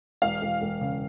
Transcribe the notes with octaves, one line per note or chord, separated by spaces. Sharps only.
E1 F5
E1
E1
C#3